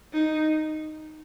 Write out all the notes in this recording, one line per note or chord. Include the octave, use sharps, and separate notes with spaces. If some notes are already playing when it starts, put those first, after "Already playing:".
D#4